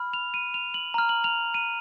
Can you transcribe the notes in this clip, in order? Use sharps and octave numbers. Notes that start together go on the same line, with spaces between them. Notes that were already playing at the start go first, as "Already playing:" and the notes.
Already playing: B5 F6
F7
D#7
F7
F#7
A#5 F6
F#7
F7
D#7